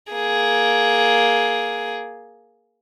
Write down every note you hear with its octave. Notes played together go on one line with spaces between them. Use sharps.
A#3 G#4